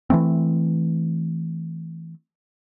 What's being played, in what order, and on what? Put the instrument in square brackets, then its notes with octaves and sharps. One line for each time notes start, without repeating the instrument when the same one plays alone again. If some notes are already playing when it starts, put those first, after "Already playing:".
[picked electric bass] E3 F3 A3 C4